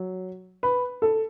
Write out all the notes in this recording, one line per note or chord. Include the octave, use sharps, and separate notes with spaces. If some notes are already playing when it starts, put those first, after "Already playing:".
Already playing: F#3
B4
A4